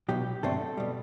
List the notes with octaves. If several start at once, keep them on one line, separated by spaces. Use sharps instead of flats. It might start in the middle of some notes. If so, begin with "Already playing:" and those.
B1 B2 F#3 G4
G2 D3 F#3 A3 C4 A4
B2 G3